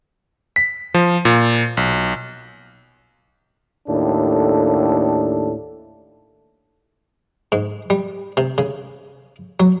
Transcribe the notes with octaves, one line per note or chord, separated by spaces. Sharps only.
B6
F3
A#2
B1
D#2 A2 D4 A4
G#2
G3
C3
C#3
F#3